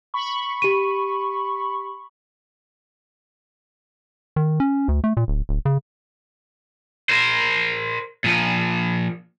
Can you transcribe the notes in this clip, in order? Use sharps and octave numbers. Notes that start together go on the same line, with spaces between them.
B5 C#6
G4 D#7
D#3
C#4
D2
A3
A#2
D1
D1
C#3
A#4 C5
A#2 F3